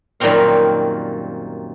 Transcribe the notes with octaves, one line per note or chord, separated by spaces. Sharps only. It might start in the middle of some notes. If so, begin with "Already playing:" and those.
F#2 A#2 D#3 G3 C4 F5